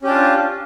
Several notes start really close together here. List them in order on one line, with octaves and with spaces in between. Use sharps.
C#4 G4 D4 F4